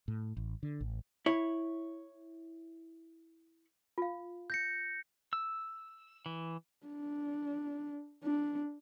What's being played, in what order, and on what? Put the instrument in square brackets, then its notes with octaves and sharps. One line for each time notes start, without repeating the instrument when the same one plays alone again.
[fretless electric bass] A2
A1
D3
A1
[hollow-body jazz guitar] E4 C#5
[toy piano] F4 F5
[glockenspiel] G6 A#6 C#7
[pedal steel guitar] E6
E3
[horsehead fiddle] D4
D4